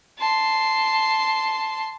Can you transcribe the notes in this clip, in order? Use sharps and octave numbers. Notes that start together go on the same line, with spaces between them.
A5 C6